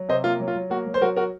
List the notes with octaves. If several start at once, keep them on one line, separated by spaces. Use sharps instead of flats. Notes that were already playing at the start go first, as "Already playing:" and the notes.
Already playing: F#3
C3 C5 D#5
A#3 F4
F#3
F4
F#3
A#3 F#4
F#3
C5
F#3 F#4 A#4
F#4 A#4